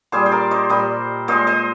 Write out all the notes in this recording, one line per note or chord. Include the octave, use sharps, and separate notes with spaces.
A#2 G3 G#4 C5
C5
A#4 D5
C5 D#5
A#2 G3 C5 D#5
A#2 G#3 C5 D#5
C5 D#5